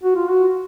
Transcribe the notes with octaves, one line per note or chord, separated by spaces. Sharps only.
F#4
F4
F#4